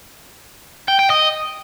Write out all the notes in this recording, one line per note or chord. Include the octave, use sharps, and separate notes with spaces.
G5
G5
D#5